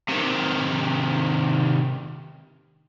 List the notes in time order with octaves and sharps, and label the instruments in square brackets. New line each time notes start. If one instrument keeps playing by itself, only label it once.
[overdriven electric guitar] C3 D#3